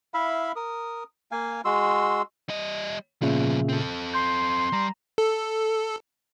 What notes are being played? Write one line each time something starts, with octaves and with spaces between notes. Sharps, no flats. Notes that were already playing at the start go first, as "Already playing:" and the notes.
E4 E5 F5 B5
A#4 D#6
A#3 F5 G#5
G#3 F#4 C6 E6
G3 D#5
A#2 C#3 F3 B3 E5
C4 A4
C6 G6
G3 A#5
A4